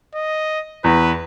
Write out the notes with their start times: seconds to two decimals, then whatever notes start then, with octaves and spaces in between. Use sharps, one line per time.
0.15 D#5
0.84 E2 B4